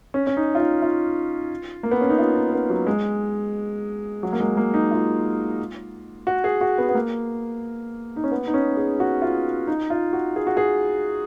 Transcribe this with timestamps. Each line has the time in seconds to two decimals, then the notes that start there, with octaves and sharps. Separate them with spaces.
0.14 C#4
0.27 C#4
0.37 D#4
0.55 F4
0.60 D#4
0.82 F4
1.83 A#3
1.91 B3
2.01 C#4
2.09 D#4
2.19 F4
2.36 D#4
2.53 B3
2.70 F#3
2.86 G#3
4.23 F#3
4.33 A#3
4.40 G#3
4.57 A#3
4.74 D#4
4.91 F4
6.27 F#4
6.44 G#4
6.61 F#4
6.78 B3
6.89 B3
6.95 A#3
8.16 D#4
8.24 C#4
8.32 B3
8.47 D#4
8.54 C#4
8.77 G#4
9.00 F#4
9.22 F4
9.67 D#4
9.90 F4
10.13 F#4
10.36 G#4
10.47 F#4
10.57 G#4